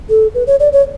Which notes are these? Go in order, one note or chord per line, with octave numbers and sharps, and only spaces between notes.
A4
B4
C#5
D5
C#5